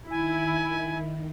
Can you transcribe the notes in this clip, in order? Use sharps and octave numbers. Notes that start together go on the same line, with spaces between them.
D#3 E4 G#5